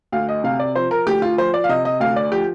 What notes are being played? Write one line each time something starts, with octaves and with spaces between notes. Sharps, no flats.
D2 F5
D#5
C3 F5
D5
F3 C5
A#4
D2 G4
F4
F3 C5
D5
F5
C3 D#5
D#5
D2 F5
D5
F3 G4